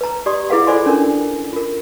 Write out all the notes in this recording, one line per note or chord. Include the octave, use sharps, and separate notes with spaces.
B4 A#5
G4 D5 C6 D#6
E4 G#4 B4 F5 F#5
F4 A4 C5 D5 G#5 C6
C#4 D4 A#4
F4 A#4